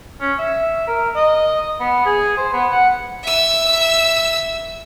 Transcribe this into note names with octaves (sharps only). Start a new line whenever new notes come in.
C#4
E5
A#4
D#5
B3
G#4
C5
B3
F#5
E5 E6